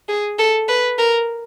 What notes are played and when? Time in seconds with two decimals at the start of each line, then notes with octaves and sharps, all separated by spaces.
0.09 G#4
0.39 A4
0.69 B4
0.99 A#4